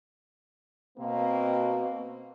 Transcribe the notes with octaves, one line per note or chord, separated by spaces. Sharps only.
B2 A#3 C4